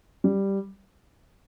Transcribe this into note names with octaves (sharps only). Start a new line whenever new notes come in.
G3